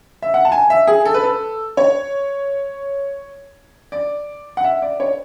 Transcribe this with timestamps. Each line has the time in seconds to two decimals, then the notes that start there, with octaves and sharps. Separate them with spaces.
0.22 E5
0.34 F#5
0.45 A5
0.52 G#5
0.70 E5
0.87 G#4
1.05 A4
1.14 B4
1.23 A4
1.77 C#5
3.92 D5
4.57 F#5
4.64 E5
4.82 D5
5.00 C#5